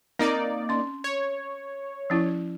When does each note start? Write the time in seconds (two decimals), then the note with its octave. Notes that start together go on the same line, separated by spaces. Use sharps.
0.19 A#3 C4 D#4 D5
0.69 C#4 C6
1.04 C#5
2.10 F3 C#4 E4